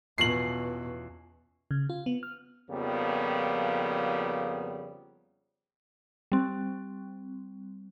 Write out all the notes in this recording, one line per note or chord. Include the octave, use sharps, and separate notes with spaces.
E2 B2 C#4 F4 C7 F#7
C#3
F4
B3
F6
F2 C#3 F3 G3 A#3 B3
G3 C4